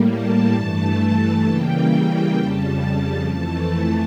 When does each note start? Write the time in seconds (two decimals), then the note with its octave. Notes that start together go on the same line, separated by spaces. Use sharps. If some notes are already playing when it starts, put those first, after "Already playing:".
Already playing: A2 G3 A#3
0.08 A5
0.54 G2 E3 A3
1.46 C#3 E3 G3 A#3 G5
2.38 F2 C#3 G3 A5
3.30 F2 E3 A3 A5